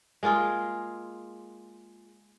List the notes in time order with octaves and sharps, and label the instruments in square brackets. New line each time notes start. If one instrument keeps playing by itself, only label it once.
[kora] G#3 A#3 F4 G#4